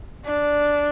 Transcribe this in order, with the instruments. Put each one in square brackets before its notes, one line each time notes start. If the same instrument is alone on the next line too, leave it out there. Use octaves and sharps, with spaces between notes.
[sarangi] D4